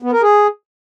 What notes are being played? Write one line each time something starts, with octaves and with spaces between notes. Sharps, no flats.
B3
A#4
G#4